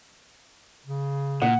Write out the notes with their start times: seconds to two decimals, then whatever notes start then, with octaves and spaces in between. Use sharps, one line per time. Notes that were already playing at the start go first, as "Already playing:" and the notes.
0.86 C#3
1.42 A#2 F#5